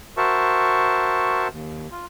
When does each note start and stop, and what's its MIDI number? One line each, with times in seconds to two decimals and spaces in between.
0.17 1.48 66
0.17 1.48 70
0.17 1.48 72
0.17 1.48 76
0.17 1.48 81
0.17 1.48 85
1.52 1.88 39
1.91 2.06 65